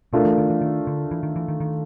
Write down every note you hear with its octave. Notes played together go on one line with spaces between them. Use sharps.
B2 A3 D4 F4 A#4
E3
D#3
E3
D#3
D3
E3
D#3
E3
D#3
D#3